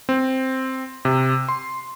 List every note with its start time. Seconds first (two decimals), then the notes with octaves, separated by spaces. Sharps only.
0.09 C4
1.05 C3
1.49 C6